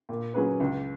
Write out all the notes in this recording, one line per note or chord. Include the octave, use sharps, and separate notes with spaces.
A#2
F#3 C#4 G#4 B4
C#2